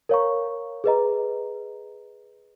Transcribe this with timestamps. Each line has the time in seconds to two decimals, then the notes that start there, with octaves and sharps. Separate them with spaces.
0.09 A#4 C#5 F5 A#5 C#6
0.84 G#4 B4 D#5 A#5